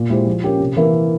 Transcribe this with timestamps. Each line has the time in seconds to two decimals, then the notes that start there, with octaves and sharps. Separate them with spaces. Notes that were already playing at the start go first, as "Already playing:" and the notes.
Already playing: A#2
0.10 G#3 E4 G4 C5
0.26 F3
0.43 A#3 C#4 G4
0.60 C3
0.77 E3 A#3 E4 A#4